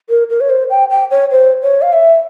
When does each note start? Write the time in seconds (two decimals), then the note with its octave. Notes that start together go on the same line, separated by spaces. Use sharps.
0.09 A#4
0.30 A#4
0.41 C#5
0.50 C5
0.70 G5
0.90 G5
1.11 C#5
1.31 C5
1.62 C#5
1.82 F5
1.93 E5